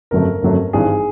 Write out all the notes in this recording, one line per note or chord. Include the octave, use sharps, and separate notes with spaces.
G1 F2 C#3 F#3 A3 A#4
G1 F2 C#3 F#3 A3
G#1 G2 E3 G#4